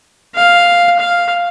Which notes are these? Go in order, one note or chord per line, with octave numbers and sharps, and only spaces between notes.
F5
F5